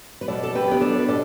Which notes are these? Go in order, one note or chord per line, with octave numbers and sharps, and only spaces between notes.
B4
B2 A4 D5
A4
G4 B4
B3 D4
A4 D5
B4
B2 A4 D5